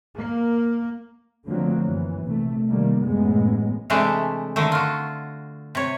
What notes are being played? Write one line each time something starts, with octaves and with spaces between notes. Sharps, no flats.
A#3
D3 F3 F#3 A3 A#3 C4
F#2 E3
A#1 C3 A3
C3 D#3 G3 A3 A#3
A1 F#2 A2 C3 G#3 B3
C3 E3 G#3 A3 D4
D3 D#3 A3
F4 F#4
C3 C#5